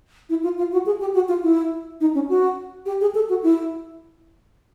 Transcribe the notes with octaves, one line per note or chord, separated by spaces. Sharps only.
E4
F4
F4
F#4
G#4
G4
F#4
F4
E4
D#4
C#4
F#4
G4
G#4
A4
F#4
E4